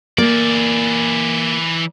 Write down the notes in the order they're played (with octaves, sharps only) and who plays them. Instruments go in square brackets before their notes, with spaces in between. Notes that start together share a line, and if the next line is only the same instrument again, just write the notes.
[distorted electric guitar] E3 D5 [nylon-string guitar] A#3